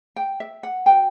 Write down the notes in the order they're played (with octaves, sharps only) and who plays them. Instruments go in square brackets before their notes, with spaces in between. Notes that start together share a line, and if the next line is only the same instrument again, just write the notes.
[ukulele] G5
E5
F#5
F#4 B4 G5